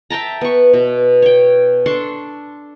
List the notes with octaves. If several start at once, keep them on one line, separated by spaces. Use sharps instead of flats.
E5 G5 A5 A#5
B3 C#6
B2
C#5 G5
D4 A4 C6 C#6